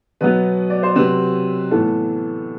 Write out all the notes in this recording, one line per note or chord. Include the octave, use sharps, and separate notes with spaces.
B2 F#3 B3 B4
D5
C5
C3 F#3 C4 B4
A2 E3 B3 A4